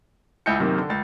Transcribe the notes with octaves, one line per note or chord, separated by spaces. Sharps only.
C#2 E4 G#5 G6 C#7
F#2 C3 D#3 A#3
D3
C#2 A6